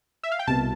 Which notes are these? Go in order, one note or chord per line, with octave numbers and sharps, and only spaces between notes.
E5
F5
G5
C2 B2 A5